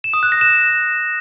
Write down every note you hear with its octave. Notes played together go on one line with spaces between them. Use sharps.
E7
D#6
F#6
A#6
E7